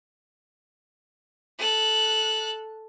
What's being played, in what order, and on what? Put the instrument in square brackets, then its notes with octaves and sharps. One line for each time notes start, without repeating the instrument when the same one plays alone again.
[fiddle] A4 F#6